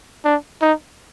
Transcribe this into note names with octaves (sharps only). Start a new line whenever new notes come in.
D4
D#4